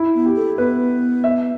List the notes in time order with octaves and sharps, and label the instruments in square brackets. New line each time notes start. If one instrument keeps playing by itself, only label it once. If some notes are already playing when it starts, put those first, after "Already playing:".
Already playing: [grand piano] E4
[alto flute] B3
[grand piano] G4
[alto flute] A4
[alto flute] B3 [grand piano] B4
[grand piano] E5